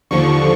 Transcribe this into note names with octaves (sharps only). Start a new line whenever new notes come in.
D#2 D3 F3 C#6